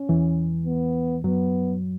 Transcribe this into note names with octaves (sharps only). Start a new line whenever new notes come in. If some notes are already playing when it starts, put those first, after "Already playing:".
Already playing: C#4
E2 E3
B3
F#2 F#3 B3